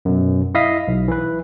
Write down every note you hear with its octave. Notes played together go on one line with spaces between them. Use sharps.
F#2 B2
E4 D#5 F5 D#6 B6
B1
E3 B4